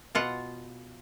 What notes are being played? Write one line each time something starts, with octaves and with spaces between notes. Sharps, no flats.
B2 F4 F#5